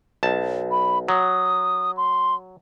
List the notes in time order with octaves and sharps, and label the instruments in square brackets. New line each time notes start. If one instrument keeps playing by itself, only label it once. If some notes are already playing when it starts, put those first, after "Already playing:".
[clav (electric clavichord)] B1 A5
[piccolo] B5
[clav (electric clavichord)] F#3 [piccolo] D#6
[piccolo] C6